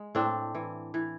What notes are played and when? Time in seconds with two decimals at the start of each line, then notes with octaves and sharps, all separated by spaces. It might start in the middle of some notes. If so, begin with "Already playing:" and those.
Already playing: G#3
0.15 A2 C4 D4
0.55 E3
0.94 E3